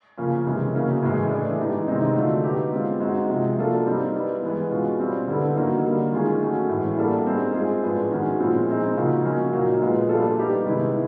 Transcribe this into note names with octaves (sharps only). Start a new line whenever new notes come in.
C#3 F3 A#3 C#4
C3 E3 G#3 C#4
C#3 F#3 A#3 C#4
A2 E3 G#3
E3 A3 D4
E3 G#3 B3 D#4 G4
C3 D#3 G#3 C4 D#4
D3 F#3 A3 D4 F4
F#3 B3 D#4 G4
G#3 C4 F4
G#3 C4 D#4 F#4
C3 F3 G#3
F#3 A#3 D4 F4 A4
G3 C4 D#4
G3 B3 E4
E3 G#3 B3
B2 G#3 C#4 F4
G3 C4 F4
D3 G3 B3 E4 A4
D3 F#3 A#3 D#4
D3 G3 A#3
D#3 G#3 C#4 F4 G#4
F#3 A3 C#4 F#4
A2 E3 G#3
G3 A#3 D4 F#4 A4
G3 C4 D#4 G#4
G#3 C4 F4 G#4
A2 F3 G#3 B3 D4
D#3 G#3 C#4 F#4
A#2 F3 G#3 C4 E4
G#3 C4 D#4 G#4
C#3 F3 A#3 D#4 F#4
F#3 A#3 C#4 F4
A#2 F#3 A#3 D#4
A#2 F3 G#3 B3
G3 A#3 D4 F4 A4
G3 B3 D#4 G4
C3 D#3 G#3 B3 E4